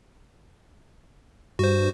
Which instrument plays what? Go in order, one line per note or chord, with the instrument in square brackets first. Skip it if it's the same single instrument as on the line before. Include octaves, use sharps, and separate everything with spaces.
[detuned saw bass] G2 [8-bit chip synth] F#4 C5